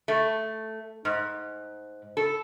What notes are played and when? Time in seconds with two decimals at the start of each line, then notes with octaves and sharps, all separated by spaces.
0.08 A3
1.05 G#2
2.17 A4